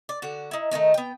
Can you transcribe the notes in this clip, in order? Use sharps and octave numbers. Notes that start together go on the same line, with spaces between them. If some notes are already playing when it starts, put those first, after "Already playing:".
D5
D3 F#4
D#4 E4
D#3 A3 C#4 D#4
B3 G5